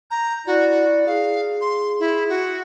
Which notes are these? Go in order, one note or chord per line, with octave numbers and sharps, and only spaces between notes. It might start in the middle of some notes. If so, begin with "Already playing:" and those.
A#5 G6
E4 F#4 D5
G#4 F5
C6
E4
F#4